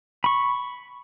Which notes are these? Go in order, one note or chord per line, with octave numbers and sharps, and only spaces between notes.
B5 C#6